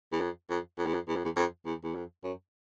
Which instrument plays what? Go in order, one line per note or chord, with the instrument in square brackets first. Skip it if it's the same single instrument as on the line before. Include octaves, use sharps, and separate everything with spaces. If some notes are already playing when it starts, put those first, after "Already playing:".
[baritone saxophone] E2
F2
F2
F2
E2
F2
E2
F2
E2
F2
E2
E2
F2
F#2